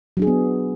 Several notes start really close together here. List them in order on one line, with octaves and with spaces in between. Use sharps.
F#3 D4 G#4 F#4 B3